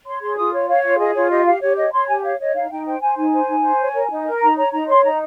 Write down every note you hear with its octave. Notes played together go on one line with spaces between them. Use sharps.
C#5 C6
G#4 C6
F4 D#6
C#5
C#5 F5
F4 F5
G#4 D#5
F4 C#5
G4 D#5
G4 F5
G4 C#5
C#5 D#5
C#5 C6
G4 G#5
C#5 F5
C#5 D#5
D#4 F5
D#4 G5
C5 G5
C5 G#5
D#4 G#5
C5
D#4
C5
C#5
A#4
D#4
A#4
D#4 A#5
C#5 A#5
D#4 A#5
C#5 C6
D#4 A#5